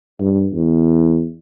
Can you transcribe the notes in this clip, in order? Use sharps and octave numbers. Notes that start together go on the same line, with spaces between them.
G2
E2